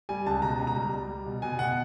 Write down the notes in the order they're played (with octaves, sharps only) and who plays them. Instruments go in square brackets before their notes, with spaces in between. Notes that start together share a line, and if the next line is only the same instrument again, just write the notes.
[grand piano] G3 G#5
C#2 A5
B2 A#5
C#2
A#5
G3
G3
G3
B2
B2 G#5
B2 F#5